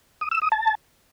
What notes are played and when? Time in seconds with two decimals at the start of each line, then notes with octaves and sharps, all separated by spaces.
0.21 D#6
0.31 E6
0.42 D#6
0.52 A5